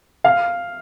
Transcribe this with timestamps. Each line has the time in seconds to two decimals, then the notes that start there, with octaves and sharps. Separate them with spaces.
0.24 F5